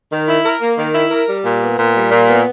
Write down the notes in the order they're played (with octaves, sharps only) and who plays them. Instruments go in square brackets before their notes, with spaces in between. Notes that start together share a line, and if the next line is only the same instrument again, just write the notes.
[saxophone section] D#3
E4
A#4
A#3
D#3
E4
A#4
G3
A#2
B3
A#2
G3
A#2
B3